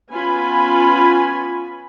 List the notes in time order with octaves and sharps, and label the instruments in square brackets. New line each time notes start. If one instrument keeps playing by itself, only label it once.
[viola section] B3 C#4 F4 G#5 B5